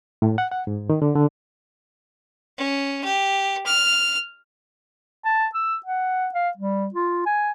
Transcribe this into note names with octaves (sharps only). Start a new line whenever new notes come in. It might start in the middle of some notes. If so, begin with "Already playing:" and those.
A2
F#5
F#5
G#2
D#3
D3
D3
C#4
G4
F6
A5
E6
F#5
F5
G3
F4
G#5